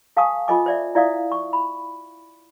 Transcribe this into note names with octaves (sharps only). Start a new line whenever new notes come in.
A4 F5 G#5 A5 C#6 D#6
F4 A4 C5 D#5 G#5 D6
C5 D5 E5
E4 D5 E5 F5 D#6
C#6
B5